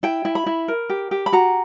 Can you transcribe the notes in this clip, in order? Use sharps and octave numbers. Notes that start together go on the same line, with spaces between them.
E4 G5
E4
B5
E4
A#4
G4
G4
B5
F#4 A#5